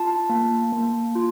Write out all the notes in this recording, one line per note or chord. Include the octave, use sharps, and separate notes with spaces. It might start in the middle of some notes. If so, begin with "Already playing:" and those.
Already playing: F4 A5
A#3
A#3
F4